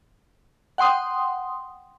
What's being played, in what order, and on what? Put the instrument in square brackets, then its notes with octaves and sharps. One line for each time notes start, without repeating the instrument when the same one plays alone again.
[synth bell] F#5 G5 C6 D#6